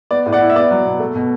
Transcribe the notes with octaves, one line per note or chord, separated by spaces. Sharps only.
B3 D5
A2
D5 F#5
E4
E5
B3 D5
F#3
B2
A3
B2